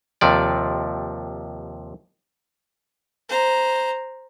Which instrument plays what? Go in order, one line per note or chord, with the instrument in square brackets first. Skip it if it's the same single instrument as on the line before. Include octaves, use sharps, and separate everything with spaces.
[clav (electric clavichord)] D#2 C3 F3 D5
[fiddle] C5 A#5